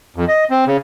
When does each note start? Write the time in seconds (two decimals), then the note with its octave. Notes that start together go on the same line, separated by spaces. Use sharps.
0.16 F2
0.28 D#5
0.50 C4
0.67 C#3